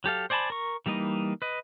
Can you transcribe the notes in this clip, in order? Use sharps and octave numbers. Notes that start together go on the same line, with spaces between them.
F#3 G4 A4 F5
C5 D5 G#5 A5 B5
A#4 C#6
E3 G3 A#3 D#4 D#5
B4 D#5